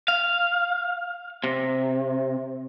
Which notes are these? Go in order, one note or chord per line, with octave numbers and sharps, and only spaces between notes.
F5
C3